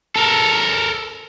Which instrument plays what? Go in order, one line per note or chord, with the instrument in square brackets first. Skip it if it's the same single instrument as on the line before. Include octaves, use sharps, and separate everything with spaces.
[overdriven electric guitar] A4 A#4